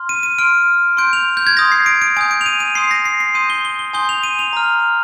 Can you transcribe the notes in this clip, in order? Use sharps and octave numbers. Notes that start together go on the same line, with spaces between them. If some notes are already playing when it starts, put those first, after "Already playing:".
Already playing: C6 F6
D#7
D#7
C6 F6 D7
C6 G6 D7
F7
G6
G#6
C6 D#6 G6 A#6
C7
D7
D7
G#5 D#6 G6 D7
D7
F7
D#7
D#7
C6 D#6 G6 C7
A#6
C7
C7
C6 D#6 G6 D#7
G7
G7
G7
G#5 C6 D#6 G6 G7
F7
D#7
F7
A#5 F6